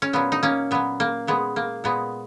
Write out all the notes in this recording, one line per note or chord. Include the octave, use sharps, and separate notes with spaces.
C#4
A#2 F#3 B3
D#4
A#3 C#4
A#2 F#3 B3
A#3
A#2 G#3 B3
A#3
A#2 G#3 B3